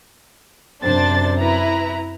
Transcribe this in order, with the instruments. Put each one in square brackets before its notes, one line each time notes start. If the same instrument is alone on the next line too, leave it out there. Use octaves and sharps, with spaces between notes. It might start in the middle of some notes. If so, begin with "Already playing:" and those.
[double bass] F#2 C3 [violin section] D4 C5 A6
[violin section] E4 B4 A#5